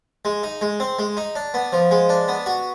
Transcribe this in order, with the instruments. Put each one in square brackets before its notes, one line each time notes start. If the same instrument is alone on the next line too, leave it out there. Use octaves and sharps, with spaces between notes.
[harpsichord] G#3
D#4
G#3
C4
G#3
D#4
D4
B3
F3
G#3
D4
B3
F#4